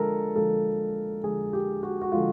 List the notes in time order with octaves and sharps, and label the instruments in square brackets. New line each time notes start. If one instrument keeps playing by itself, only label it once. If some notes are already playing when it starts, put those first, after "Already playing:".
Already playing: [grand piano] D3 F3 G#3 A4 A#4
D3 F3 G#3 A4
D3 F3 G#3 G#4
G4
F#4
F#4
D3 F3 G#3 F4